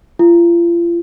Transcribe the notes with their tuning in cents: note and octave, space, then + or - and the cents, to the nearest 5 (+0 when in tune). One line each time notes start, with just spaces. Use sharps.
F4 -35